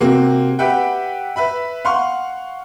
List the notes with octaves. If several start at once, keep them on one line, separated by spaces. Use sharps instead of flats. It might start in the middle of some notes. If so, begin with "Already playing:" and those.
C3 A#3 C4 F#4
G4 B4 E5 F#5 G5
B4 E5 B5
F5 F#5 C6 C#6